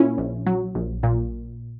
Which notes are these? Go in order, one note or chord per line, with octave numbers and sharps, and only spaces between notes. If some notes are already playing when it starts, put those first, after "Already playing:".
Already playing: A#2 C#4 E4
A#1
F#3
A#1
A#2